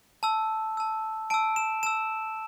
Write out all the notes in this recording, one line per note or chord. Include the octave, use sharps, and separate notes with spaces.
A5 E6
A5 E6
A5 E6 D7
E7
A5 E6 E7